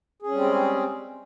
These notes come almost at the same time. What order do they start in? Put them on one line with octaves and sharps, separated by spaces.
G#4 C#4 G3 C4 G#3